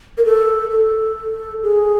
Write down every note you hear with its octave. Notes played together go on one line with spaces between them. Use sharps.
A#4
A4
A4
G#4